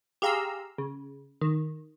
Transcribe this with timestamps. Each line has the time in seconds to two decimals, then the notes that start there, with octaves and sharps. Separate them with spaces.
0.22 G4 G#4 F5 A#5 C6 E6
0.78 C#3
1.41 D#3